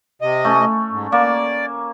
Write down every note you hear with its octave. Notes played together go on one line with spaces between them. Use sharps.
C3 D#5
A3 C#4
G#2
A#3 D5